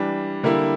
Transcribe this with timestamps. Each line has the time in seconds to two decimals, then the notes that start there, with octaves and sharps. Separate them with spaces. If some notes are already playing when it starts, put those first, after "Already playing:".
Already playing: E3 G3 D4
0.43 D3 G3 A#3 E4